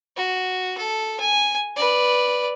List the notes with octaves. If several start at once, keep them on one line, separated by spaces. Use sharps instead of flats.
F#4
A4
G#5
B4 D5